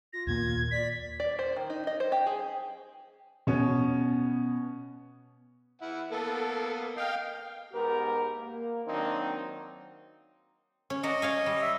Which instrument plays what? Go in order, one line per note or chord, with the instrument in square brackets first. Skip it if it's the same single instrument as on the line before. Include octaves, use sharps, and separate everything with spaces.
[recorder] F4 [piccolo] A#6
[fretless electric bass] D#2 A#2 A#3 [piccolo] G#6
[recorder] D5 [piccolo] B6
[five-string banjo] D5
C5
D#3
D#4
D#5
C5
G4
G#4
[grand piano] B2 B3 C#4
[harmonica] E3 E4 F#5
[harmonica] A#3 B3 [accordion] A4
[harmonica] D#5 [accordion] F5 G5
[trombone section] G#2 B3 G4 A#4
A#3
D#3 F#3 A#3 C4 D4 D#4
[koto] C#4
[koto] F#4 A#4 D5 [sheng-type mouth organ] D#5
[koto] C#5 F5 G#5
G3
[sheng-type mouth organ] E5